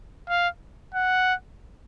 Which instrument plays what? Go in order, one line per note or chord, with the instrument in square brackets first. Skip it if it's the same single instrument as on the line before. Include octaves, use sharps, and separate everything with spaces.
[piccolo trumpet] F5
F#5